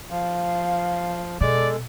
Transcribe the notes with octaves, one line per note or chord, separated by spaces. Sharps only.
F3 F5
B2 G#3 A4 D5